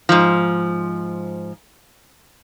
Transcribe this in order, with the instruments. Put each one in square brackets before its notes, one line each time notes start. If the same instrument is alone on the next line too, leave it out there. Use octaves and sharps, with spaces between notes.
[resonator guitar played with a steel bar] G#2 F3